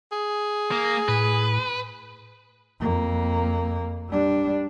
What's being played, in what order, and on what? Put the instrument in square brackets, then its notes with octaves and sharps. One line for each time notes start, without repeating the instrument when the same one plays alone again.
[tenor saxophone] G#4
[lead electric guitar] A#3
[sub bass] A2 [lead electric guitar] B4
[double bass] F2 A#3
G3 D4